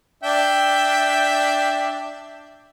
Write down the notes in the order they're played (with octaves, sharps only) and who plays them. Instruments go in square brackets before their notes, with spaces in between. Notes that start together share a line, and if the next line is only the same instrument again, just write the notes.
[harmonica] D4 E5 G5